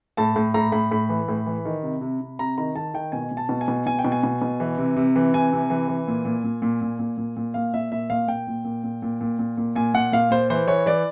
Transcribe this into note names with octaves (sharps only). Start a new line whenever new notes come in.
A2 A5
A2
A2 A#5
A2 B5
A2 B5
E3
A2
E3
D#3
C3
C3
C3
C3 A#5
D#3 A#5
D#3 A5
D#3 G5
B2 G#5
B2
A5
B2
G#5
B2
B2 G#5
G5
B2
G#5
B2
B2
E3
C3
C3
E3
C3 G#5
C3
E3
E3
A#2
A#2
A#2
A#2
A#2
A#2
A#2
A#2
A#2 F5
A#2 E5
A#2 E5
A#2 F5
A#2 G5
A#2
A#2
A#2
A#2
A#2
A#2
A#2
A#2 G#5
A#2 F#5
A#2 F5
A#2 C5
E3 C5
E3 C#5
E3 D5